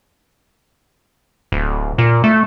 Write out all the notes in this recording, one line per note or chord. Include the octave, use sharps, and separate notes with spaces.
D1
A#2
A3